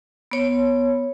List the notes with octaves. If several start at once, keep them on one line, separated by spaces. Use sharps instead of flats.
B3 C#5